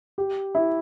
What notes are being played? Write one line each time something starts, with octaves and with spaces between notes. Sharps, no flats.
G4
E4